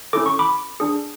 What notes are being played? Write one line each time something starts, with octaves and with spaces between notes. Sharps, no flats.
C#4 E4 A4 D6
C#6
B5 D6
D4 G#4